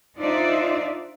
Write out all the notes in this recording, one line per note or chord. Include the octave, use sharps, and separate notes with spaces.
D4 D#4 F4 C5 D5 E5